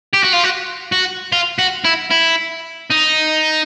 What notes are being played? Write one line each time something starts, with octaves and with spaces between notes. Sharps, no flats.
G4
F#4
F4
F#4
F#4
F4
F#4
E4
E4
D#4